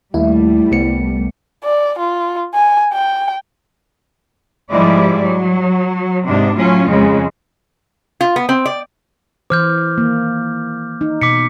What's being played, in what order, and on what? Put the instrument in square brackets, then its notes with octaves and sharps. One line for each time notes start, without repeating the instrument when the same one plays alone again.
[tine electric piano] D#2 [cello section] G3 A3 [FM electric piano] E4
[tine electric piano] C2 B3 C#7
[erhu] D5
F4
G#5
G5
[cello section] G#2 F3 G3 G#3 E4 D5
F#3
G#2 C3 D4
A2 F#3 C#4 F4
F2 C#3 G#3
[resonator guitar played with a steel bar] F4
B3
C4
D5
[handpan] E3 C5 [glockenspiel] D6 F6 G6
[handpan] D#3 A#3
D#4
[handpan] B2 [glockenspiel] D6 B6 C#7